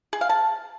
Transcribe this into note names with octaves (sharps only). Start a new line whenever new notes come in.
G#4
F5
A5